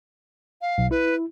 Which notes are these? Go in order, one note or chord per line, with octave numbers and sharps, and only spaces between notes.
F5
B1
E4 B4